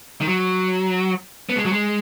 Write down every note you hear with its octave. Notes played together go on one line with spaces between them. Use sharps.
D#3
F#3
B3
G#3
F#3
G#3